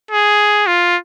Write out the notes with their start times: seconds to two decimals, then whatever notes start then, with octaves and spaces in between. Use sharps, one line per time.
0.11 G#4
0.67 F4